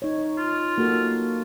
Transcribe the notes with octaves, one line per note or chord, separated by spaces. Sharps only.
D#4 C#5
F4
A#3 F#4 A4